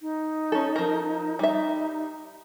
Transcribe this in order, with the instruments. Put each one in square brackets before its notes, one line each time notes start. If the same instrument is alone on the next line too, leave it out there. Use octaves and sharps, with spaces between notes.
[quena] D#4
[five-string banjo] C#4 A4
F3 A#4
[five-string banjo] G3 E5 [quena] D#4